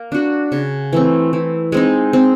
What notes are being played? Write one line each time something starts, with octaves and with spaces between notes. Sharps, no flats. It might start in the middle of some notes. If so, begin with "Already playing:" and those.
Already playing: A#3
D4 F#4
C#3
E3 A3 C4
E3
G#3 C4 D#4
C4